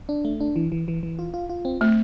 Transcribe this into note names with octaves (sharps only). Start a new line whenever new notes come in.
D4
A3
D4
E3
E3
E3
E3
F4
F4
F4
C4
A3 C4